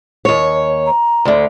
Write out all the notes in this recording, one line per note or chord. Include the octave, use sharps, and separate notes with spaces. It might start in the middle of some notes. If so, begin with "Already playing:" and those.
D#2 C#5
A#5
D2 D3